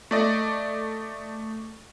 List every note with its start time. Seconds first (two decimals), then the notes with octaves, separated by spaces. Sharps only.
0.11 A3 D5 D#5